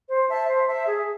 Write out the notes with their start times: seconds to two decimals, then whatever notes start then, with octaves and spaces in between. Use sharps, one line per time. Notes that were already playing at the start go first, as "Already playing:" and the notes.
0.09 C5
0.29 E5 A5
0.48 C5
0.67 E5 A5
0.87 G#4